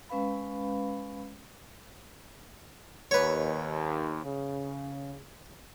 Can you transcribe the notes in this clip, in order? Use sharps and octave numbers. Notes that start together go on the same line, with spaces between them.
G#3 C#4 B4 F5 B5
D#2 B4 C#5
C#3